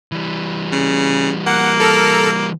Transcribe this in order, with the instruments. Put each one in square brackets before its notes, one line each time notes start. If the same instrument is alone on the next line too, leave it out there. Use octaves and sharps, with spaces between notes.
[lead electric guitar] E3 G3
[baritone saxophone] C#3
[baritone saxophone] A#3 [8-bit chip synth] F#5
[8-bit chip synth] A4 A#4